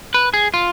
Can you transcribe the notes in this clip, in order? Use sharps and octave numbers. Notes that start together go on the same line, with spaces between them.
B4
G#4
F4